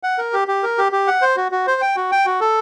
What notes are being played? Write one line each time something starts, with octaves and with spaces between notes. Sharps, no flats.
F#5
A#4
G4
G4
A#4
G4
G4
F#5
C5
F#4
F#4
C5
G5
F#4
G5
F#4
A4